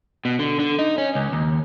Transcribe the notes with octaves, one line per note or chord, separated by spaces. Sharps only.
B2
D3
D3
D#4
C#4
C#2
D#2